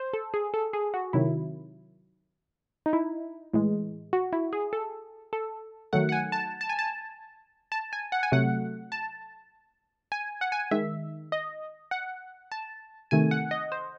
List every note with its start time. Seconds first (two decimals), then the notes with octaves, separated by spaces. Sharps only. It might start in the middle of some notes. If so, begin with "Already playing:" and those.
Already playing: C5
0.14 A4
0.34 G#4
0.54 A4
0.73 G#4
0.94 F#4
1.13 C3 D#3 F#3 E4
2.86 D#4
2.93 E4
3.54 A2 E3 G#3
4.13 F#4
4.33 E4
4.53 G#4
4.73 A4
5.33 A4
5.93 D#3 F#3 A3 F#5
6.09 F#5
6.12 G#5
6.32 A5
6.61 A5
6.69 G#5
6.79 A5
7.72 A5
7.93 G#5
8.12 F#5
8.23 G#5
8.32 C3 F#3 A3 F#5
8.92 A5
10.12 G#5
10.41 F#5
10.52 G#5
10.71 D#3 G#3 E5
11.32 D#5
11.91 F#5
12.52 A5
13.11 C3 D#3 A3 G#5
13.31 F#5
13.51 D#5
13.72 C5